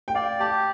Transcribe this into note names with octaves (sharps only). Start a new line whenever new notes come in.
G5
D5 F5
G4 A5